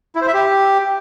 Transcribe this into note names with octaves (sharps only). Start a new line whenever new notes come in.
E4
C5
E5
G4